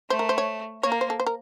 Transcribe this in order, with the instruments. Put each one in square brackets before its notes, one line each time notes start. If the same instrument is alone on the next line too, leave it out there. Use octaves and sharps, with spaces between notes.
[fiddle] A3 [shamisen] C5
[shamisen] A#4
C5
C#5
[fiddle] A#3 [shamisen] C#5
[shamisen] A#4
C5
A4
C5
A#4